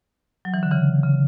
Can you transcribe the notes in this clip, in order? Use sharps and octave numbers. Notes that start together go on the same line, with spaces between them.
F#3
E3
D3
C#3 E3
C#3